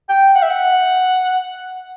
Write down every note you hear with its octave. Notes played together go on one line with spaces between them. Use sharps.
G5
F#5
E5
F#5